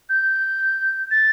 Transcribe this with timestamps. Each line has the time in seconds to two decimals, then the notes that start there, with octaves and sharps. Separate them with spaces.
0.09 G6
1.11 A6